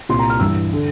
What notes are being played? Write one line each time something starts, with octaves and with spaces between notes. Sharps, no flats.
C2 A#2 C6
A#5
F6
G2 E3 E6
D3